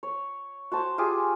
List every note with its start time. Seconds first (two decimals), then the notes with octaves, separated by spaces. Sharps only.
0.03 C#5
0.72 F#4 C5 A5
0.98 F4 G4 G#4 D6